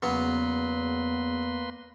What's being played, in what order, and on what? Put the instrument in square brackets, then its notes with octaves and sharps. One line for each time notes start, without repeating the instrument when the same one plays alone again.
[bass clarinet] E2 [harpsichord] C#3 F#3 B3 [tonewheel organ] A#3 B4 C6